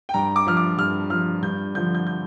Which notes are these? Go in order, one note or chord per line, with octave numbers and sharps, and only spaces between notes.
G5
G2 A#5
D6
F3 F6
D6
G2 F6
F3 F6
G2 G6
D3 F3 G6
G6
G6